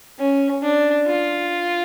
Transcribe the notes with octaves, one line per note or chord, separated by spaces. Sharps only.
C#4
D4
F4